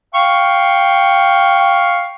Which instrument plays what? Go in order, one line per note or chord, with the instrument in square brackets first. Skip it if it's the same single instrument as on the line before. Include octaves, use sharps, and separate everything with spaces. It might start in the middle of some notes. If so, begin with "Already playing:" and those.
[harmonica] F5 G5 C#6